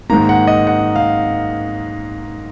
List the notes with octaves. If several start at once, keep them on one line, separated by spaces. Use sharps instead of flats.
G#2 D#3 A#3 A#5
F#5
D#5
F#5
F5